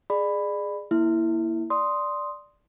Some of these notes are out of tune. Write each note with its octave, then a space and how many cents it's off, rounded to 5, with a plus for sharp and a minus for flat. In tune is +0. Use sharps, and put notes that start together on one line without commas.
G#4 +0 D5 +30 B5 +10
A#3 +0 E4 +0
D5 +0 C6 +0 D#6 +0